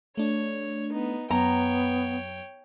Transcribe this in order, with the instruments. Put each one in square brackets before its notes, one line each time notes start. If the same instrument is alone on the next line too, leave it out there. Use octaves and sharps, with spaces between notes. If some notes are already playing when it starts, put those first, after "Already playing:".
[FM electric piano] A3 D4 [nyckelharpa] C#5
[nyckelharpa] B3 D#4
[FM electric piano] F#2 [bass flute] B3 [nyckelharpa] C#5 G5 [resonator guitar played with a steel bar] A#5